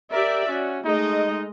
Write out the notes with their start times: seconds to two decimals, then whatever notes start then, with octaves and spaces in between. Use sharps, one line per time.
0.12 G4 A#4 D5 E5
0.48 C#4 F#4
0.85 G#3 A3 D#4 D#5